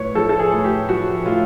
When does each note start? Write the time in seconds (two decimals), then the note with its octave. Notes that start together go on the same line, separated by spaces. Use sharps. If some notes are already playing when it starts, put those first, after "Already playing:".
Already playing: A2 B4 C#5
0.15 F3 A4
0.29 A4
0.39 G#4
0.52 A2
0.65 G4
0.89 F3 F#4
1.26 A2 F4